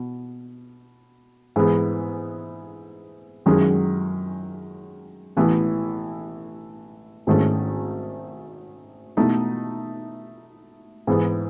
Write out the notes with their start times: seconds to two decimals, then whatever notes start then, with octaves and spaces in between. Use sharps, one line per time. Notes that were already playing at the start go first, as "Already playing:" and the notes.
Already playing: B2
1.56 G#2 E3 G#3 B3
3.46 F#2 D#3 G#3 C#4
5.37 A1 A2 E3 B3
7.27 G#1 G#2 D#3 A3 C#4
9.17 B2 A3 D#4
11.07 G#2 E3 B3